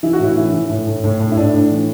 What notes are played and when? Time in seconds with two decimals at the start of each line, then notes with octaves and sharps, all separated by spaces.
0.03 E3 E4
0.13 F#4
0.19 A2 E4
0.37 E3
0.53 E3
0.70 A2
0.87 A2
1.04 A2
1.20 A2
1.32 E4
1.37 A2 D4
1.54 A2
1.71 E3